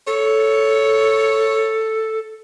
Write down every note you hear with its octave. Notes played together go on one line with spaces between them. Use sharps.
A4 C#5